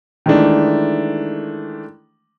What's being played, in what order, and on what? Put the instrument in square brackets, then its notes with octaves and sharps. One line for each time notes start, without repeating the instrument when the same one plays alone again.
[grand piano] D#3 E3 G#3 A3 D4